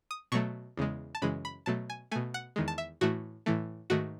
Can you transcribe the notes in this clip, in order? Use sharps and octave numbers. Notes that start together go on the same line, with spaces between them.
D#6
B2 F#3 A3 C#6
E2 C#3 G#3
A5
F#2 C#3 E3 G#3 B5
B5
B2 F#3 A3 A5
G#5
B2 A3 G#5
F#5
E2 D#3 G#3
A5
E5
A2 E3 A3 F#4
A2 E3 A3
G#2 D#3 A3 F#4